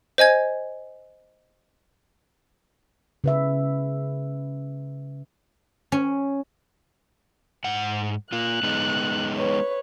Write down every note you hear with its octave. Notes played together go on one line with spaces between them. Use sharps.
C5 D#5 G#5 G#6
C#3 B4 E5
C#4
G#2 F#5
A#3 F4 F#6
G#3 B3 D#4
B4 C#5